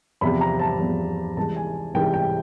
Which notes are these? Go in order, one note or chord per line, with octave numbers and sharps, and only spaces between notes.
E2 C3 F3 B5
A#5
A5
E2 C3 F3
C2 C3 E3 G#3 A5
G#5
C2 C3 E3 G#3 G5
G5